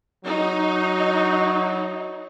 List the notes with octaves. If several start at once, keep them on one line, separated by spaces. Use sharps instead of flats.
F#3 D#4